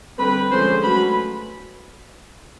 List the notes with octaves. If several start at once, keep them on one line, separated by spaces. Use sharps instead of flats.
D3 G3 C4 B4 B5
D3 F3 G#3 C#4 C5 C6
F#3 A3 C#4 B4 B5